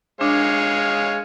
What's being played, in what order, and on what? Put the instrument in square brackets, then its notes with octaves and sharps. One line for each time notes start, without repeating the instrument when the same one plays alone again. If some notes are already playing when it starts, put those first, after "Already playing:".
[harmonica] G#3 C#5 F5 [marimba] D4